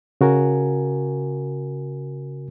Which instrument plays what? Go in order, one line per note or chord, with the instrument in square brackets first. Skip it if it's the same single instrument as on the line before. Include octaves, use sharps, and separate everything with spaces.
[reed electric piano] C#3 F#4 A#4 G#5